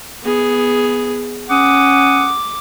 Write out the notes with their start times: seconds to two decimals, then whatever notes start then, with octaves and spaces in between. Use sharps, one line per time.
0.23 B3 G#4
1.50 C#4 F#5 D6 D#6